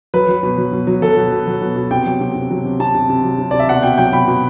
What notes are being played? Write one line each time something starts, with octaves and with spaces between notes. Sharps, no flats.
F#3 B4
F#3
B2
F#3
B2
F#3
F#3 A4
B2
B2
F#3
B2
B2
C3 G5
F#3
C3
C3
F#3
C3
C3 A5
C3
C3
F#3
C3
C3 D5
E5
B2 F#5
B2 G5
F#3 G5
B2 B5
B2